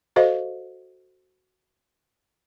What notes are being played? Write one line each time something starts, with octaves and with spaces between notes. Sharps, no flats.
F#4 A4 C5 D#5 F5